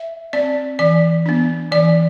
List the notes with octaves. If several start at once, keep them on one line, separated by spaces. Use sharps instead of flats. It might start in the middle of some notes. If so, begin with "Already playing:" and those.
Already playing: E5
C4 D5
E3 D5
B3 D4
E3 D5